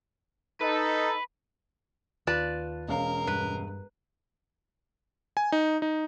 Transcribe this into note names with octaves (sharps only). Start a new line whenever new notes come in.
D#4 A4 B4
D#2 F4 B4 D5 A5
E1 C#4 A#4 F5
G2 B4
G#5
D#4
D#4